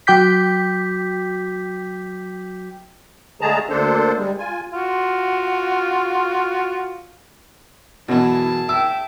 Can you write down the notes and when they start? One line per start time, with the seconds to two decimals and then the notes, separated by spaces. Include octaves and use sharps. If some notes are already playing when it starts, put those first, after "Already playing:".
0.07 F#3 F#4 G5 D6 G6 B6
3.41 D3 G#3 A3 G#4 A5 A#5
3.70 D2 A#3 D4 A4 C5
4.17 G3 G#3
4.38 F4 G#5
4.72 F4 F#4
8.09 F#2 B2 E3 E4 G#4 A5
8.69 E5 G5 D6 E6